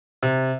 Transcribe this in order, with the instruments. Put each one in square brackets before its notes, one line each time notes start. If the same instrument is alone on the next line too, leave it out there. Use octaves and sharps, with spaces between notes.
[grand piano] C3